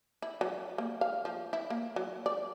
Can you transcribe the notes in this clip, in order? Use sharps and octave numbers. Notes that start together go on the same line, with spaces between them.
E4
F#3
A#3
F5
F3
E4
A#3
F#3
D5